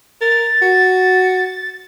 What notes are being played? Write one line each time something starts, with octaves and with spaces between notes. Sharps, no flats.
A#4 A6
F#4